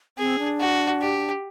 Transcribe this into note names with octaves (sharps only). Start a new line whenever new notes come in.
C4 G#4
D4
F#4
G4